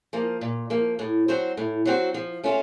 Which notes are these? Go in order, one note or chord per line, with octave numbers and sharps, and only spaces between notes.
F3 A#3
A#2
F3 A#3
A2
F#3 C4 F#4 C5
A2
F#3 C4 F#4 C5
F3
A3 C#4 F4